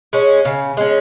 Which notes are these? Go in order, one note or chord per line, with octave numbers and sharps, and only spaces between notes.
G#3 C#4
C#3
G#3 C#4